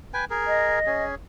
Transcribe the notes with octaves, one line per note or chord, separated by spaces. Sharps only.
B4 G5 G#5
G#4 A#4
D#5
C#4 G#4